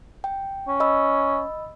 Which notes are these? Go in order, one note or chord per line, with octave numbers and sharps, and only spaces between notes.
G5
C#4
D#5 B5 E6